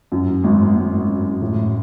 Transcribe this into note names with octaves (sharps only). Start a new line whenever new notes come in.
F#2
G#1
G#1
F#2
A2